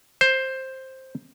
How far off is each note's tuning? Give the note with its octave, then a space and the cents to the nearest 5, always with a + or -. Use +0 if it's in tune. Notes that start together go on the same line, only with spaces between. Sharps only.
C5 +10